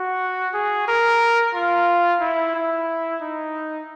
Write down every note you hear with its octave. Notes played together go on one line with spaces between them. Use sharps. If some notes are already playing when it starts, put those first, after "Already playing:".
Already playing: F#4
G#4
A#4
F4
E4
E4
D#4